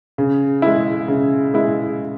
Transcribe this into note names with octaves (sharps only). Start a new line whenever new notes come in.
C#3
G#3 E4
C#3
G#3 E4